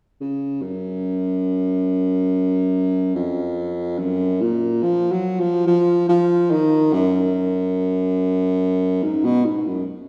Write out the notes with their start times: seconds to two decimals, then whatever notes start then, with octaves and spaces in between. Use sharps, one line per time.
0.21 C#3
0.62 F#2
3.15 F2
3.99 F#2
4.41 A#2
4.83 F3
5.12 F#3
5.40 F3
5.67 F3
6.09 F3
6.51 D#3
6.93 F#2
9.03 G#2
9.25 B2
9.45 G#2
9.67 F#2